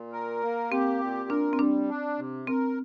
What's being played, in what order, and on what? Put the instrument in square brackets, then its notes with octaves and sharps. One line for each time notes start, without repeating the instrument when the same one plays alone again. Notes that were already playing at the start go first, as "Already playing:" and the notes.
Already playing: [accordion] A#2
A#4
A#3
[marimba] C4 [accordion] G4
[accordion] A#2
[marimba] D4 [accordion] A#4
[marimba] C4
[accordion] G3 [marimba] D4
[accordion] D4
C3
[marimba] C4 [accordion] A#4